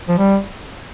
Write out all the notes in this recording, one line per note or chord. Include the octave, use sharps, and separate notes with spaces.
F3
G3